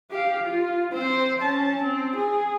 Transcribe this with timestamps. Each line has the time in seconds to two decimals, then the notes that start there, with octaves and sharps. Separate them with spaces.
0.11 G4 F5
0.45 F4
0.93 C4 C5
1.41 C#4 A5
1.82 C4
2.16 G#4